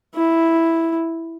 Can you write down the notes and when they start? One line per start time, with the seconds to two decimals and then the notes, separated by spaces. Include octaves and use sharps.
0.15 E4